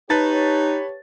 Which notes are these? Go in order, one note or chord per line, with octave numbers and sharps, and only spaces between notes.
D#4 G4 B4 C#5 A5 A6